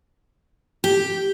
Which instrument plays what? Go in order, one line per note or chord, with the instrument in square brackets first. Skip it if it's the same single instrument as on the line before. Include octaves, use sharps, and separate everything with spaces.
[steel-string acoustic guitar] G4